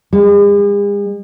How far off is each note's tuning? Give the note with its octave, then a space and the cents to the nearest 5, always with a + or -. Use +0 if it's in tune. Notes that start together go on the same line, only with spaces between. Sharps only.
G#3 -45